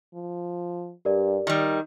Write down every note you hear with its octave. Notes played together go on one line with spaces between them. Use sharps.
F3
G2 G4 A#4 D5
D#3 G3 D#4